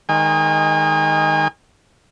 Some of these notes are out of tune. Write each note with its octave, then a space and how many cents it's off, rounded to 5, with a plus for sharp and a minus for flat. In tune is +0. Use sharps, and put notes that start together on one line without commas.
D#3 +0 G#3 +0 G#5 -40